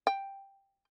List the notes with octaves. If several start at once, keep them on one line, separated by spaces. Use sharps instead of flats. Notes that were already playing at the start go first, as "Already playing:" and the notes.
G5